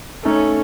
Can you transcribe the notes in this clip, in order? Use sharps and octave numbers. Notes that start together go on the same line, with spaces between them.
A3 C#4 D#4 A4